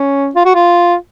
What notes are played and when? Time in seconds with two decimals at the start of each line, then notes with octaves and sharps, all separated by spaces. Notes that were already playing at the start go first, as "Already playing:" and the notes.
Already playing: C#4
0.36 F4
0.45 F#4
0.56 F4